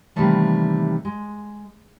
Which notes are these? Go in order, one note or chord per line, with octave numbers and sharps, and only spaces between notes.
C3 D#3 E3 G3 A3 A#3
G#3